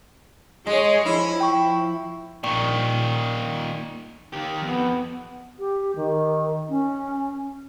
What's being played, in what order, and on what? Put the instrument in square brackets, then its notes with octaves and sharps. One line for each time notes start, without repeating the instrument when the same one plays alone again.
[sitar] G#3 [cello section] G#4 C#5
[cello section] F3 [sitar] E4
[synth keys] G5 C#6
[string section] A#1 [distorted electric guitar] A#2 D#3 [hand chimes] D5 G5 C#6
[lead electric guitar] D#3 G4
[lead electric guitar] F2 [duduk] B3
[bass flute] G4
D#3
C#4